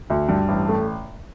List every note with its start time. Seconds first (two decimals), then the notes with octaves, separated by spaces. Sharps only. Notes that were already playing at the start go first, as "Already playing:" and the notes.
0.10 D2
0.29 G2
0.48 A1
0.68 A3